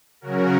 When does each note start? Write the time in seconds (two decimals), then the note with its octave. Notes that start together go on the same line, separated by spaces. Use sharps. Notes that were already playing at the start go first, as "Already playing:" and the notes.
0.21 C#3 F#3 C#4 F#4 A#4